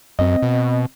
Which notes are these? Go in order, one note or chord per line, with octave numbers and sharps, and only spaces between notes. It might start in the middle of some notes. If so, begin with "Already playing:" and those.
F#2 C4 D#5
B2